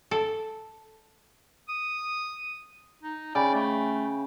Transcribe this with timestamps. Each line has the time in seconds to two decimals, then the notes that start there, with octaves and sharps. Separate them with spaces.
0.11 A4
1.69 D#6
3.03 D#4
3.35 C#3 D5 G5 B5
3.54 A3